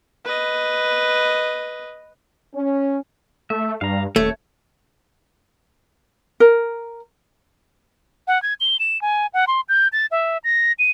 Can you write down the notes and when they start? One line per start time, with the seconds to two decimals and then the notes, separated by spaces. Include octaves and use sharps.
0.25 B4 D#5
2.55 C#4
3.50 A3 E5
3.81 G2 F5 A#5
4.16 D#1 A3 C#5
6.40 A#4
8.28 F#5
8.42 G#6
8.60 G7
8.80 E7
9.02 G#5
9.34 F#5
9.47 C6
9.69 G6
9.93 A6
10.11 E5
10.44 A#6
10.79 D#7